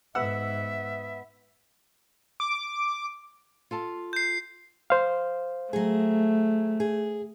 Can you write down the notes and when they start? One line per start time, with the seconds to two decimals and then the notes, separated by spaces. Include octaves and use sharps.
0.15 G#2 B3 E5 F#5 E6
2.40 D6
3.71 F4 A4 A5
4.13 G6 C7
4.90 C5 F5
5.73 F#3 A3 G#4
6.80 G#4